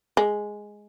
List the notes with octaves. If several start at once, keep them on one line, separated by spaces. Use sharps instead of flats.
G#3